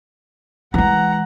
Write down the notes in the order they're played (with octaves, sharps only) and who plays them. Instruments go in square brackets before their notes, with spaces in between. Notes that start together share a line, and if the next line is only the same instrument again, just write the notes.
[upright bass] E3 G#3 [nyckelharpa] F#5 A#5